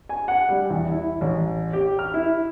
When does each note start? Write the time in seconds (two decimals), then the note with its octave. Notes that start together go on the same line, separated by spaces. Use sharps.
0.09 G#5
0.28 F#5
0.49 G3
0.70 E2
0.92 E4
1.21 A1
1.73 G4
1.99 F6
2.14 E4